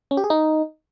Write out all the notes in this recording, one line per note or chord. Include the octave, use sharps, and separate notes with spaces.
C#4
G4
G#4
D#4